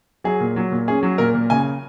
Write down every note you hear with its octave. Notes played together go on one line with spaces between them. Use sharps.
F#3 G#4
A#2
F#3
A#2
C#4 G#4
F#3
A#2 A#4
A#2
C#3 G#5